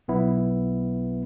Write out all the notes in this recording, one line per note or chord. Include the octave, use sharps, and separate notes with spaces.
B1 B3 E4